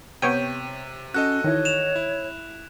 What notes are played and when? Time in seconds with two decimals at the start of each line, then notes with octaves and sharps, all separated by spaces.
0.22 C3 B3 C#5 G5 D#7
1.14 C#4 F#4 A4 D#5 F#6
1.44 D#3 E3 C#5
1.65 E7 F7
1.96 E4